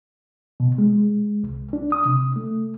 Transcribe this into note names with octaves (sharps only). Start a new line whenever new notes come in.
B2
G#3
C2
D4
D#6
C3
A3